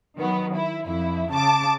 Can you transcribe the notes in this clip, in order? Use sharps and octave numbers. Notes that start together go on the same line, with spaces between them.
D#3 F#3 B3
E4
F2 E4
C#3 A5 D6